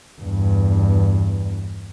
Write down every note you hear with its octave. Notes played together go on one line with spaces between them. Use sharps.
E2 G2